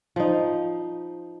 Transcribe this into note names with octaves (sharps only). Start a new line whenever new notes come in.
F3 D#4